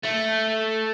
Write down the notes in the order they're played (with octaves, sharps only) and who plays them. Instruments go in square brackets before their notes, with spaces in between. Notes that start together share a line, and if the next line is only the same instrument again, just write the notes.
[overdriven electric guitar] A3